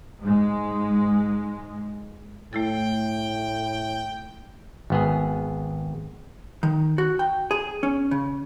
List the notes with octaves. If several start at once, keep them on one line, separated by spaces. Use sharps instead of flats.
G#2 G#3
A2 A3 E4 A4 G5
G#1 B3 G#4
D#3
F#4
G5
G#4
C#4
C#3